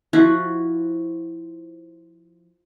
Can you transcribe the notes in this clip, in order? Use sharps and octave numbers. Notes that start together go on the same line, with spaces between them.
F3 E4 F#4